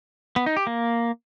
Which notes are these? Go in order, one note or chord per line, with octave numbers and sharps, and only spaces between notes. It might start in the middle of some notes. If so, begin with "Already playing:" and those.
B3
D#4
G4
A#3